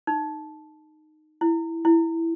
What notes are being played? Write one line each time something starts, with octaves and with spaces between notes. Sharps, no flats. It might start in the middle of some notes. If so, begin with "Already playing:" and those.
D#4
E4
E4